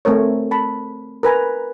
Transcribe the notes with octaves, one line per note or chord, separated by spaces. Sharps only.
A3 C4 A#4 C#5
A5 B5
A#4 B4 G#5 A#5